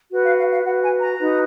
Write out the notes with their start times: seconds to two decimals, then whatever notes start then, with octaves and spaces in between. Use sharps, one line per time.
0.11 F#4 B4
0.25 F5
0.38 F5
0.51 F5
0.64 F#4 B4 F#5
0.82 G#5
0.99 A#5
1.17 D#4 F#4 B4